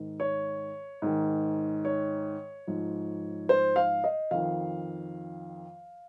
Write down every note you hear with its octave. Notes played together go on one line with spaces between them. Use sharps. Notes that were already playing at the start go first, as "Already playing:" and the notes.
Already playing: G#2 D#3
C#5
G#2 D#3
C#5
G#2 F3
C5
F5
D#5
F2 D#3 F5